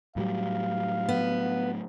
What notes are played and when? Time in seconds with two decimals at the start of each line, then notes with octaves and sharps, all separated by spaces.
0.16 A2 F#3 G3 F5
1.09 B3